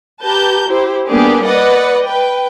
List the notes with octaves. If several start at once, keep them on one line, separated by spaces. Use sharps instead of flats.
G4 B4 A5 A#5 G6
E4 G4 C5
G3 A#3 B3 D4 G4 G#4
B4 D5 D#5 F#5
B4 G5